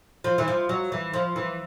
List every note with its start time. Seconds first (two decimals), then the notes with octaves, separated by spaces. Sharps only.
0.24 F3
0.38 E3
0.48 F3
0.69 F#3
0.92 E3
1.14 F3
1.36 E3